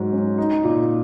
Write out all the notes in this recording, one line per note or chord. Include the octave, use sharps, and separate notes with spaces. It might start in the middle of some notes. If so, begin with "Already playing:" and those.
Already playing: G#2 F#3
C#4
D#4
A#2